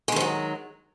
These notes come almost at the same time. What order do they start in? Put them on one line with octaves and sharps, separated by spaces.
G#3 D#3 F3 F#3